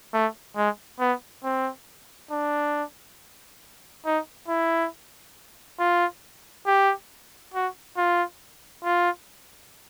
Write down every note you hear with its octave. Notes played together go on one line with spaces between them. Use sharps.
A3
G#3
B3
C4
D4
D#4
E4
F4
G4
F#4
F4
F4